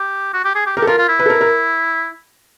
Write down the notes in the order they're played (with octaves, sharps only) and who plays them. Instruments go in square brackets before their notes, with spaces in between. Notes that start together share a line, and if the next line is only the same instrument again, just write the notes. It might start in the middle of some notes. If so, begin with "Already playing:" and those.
Already playing: [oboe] G4
F#4
G4
G#4
G4
[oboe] G4 [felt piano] A#4
[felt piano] A4
[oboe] F4 [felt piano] A#4
[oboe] F4
E4
[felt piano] B4
A4
A#4
A#4